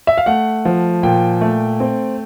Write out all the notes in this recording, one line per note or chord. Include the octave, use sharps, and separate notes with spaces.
E5
F5
A3 F#5
F3
A#2 G5
A3
C4